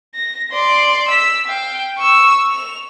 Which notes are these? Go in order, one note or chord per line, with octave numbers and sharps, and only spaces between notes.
A#6
D5 C6
E6 B6
F5 G5
C#6 E6
F7